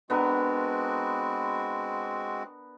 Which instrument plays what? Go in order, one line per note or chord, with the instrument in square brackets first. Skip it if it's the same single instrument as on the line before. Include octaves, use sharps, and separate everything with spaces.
[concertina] G#3 C4 F#4 [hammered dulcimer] B3 D4 A#4